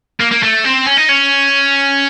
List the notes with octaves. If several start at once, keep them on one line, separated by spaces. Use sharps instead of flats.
A#3
A#3
A3
C4
C#4
D#4
C#4